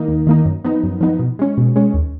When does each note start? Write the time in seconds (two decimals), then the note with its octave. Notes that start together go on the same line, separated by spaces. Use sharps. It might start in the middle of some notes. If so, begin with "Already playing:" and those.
Already playing: D#3 A#3 D#4
0.08 D#2
0.27 D#3 A#3 D#4
0.45 F#2
0.64 F3 B3 D#4
0.83 F#2
1.01 F3 B3 D#4
1.19 B2
1.39 G#3 C#4
1.58 B2
1.76 G#3 C#4
1.94 D#2